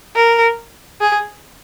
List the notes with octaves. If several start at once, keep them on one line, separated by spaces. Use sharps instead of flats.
A#4
G#4